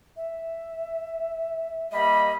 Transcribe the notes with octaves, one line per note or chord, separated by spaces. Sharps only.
E5
G3 A#3 D#5 B5